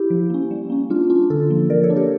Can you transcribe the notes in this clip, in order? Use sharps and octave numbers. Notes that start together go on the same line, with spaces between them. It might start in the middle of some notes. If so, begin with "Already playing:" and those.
Already playing: E4 G4
F3
A#3 C#4
G3
A#3 C#4
G3 D4 F4
C#4 D4 F4
D3 F4 A4
F3 A#3
F3 A#4 D5
A4 C#5
A#3 D4
G4 A#4